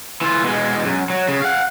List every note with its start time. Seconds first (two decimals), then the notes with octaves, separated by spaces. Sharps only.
0.21 E3 F4
0.44 B2 G#3
0.85 F#2
1.10 F#3
1.28 C#3
1.42 F5 F#5